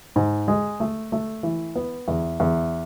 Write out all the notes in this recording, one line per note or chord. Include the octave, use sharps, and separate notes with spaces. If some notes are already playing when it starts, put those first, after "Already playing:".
G#2
G#3
A3
A3
E3
B3
E2
E2